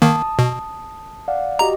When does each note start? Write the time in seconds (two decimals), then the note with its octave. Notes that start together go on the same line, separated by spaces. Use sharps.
0.02 D#3 A#3 A5 D#6
0.39 B2
1.28 D5 F5 F#5
1.59 F#4 G4 D#5 A#5